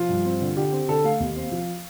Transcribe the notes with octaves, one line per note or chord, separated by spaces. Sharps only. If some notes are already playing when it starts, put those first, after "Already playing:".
Already playing: F3 F4
G2
C4
D3
D3 G4
C4
D3 A4
A3 F5
D#2
C4
F3